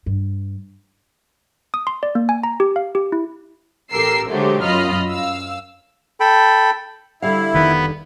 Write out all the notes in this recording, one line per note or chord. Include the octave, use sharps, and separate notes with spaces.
G2
D#6
C6
D5
A#3
G#5
A#5
G4
F5
G4
E4
A1 G4 A4 A#4 E6 C7
D3 F#3 G#3 A3 G4 C5
F#2 F4 D#5 B5 F6
F#2 F5 E6
A4 G5 B5
D3 G3 E4 F5
F1 D#3 B3 B4